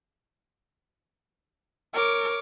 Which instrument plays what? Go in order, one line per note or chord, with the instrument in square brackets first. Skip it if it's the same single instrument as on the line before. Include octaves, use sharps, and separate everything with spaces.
[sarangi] A#4 [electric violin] C#5 D6